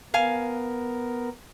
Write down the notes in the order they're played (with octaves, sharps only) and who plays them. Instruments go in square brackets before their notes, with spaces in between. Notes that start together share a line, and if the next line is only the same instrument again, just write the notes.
[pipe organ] B3 A#4 [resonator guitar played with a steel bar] F5 G#5